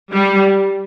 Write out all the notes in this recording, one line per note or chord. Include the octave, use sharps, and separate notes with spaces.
G3